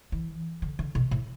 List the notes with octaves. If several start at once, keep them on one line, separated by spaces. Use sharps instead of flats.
E3
D3
D3
B2
A2